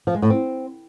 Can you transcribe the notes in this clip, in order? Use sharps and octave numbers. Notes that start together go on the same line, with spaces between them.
F3
G#3
A2
C4